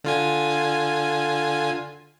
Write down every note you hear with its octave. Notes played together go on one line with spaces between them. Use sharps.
D3 F4 G#5